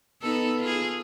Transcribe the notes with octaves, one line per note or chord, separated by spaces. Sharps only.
B3 D#4 A4
F4 G#4